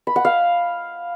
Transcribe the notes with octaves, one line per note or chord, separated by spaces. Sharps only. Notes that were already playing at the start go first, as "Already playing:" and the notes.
B5
F#5
F5